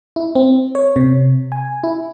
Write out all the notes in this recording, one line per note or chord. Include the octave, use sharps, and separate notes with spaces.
E4
C4
C#5
C3
G#5
E4